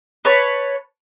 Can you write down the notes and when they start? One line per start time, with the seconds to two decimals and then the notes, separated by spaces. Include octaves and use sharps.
0.25 B4 C#5 A5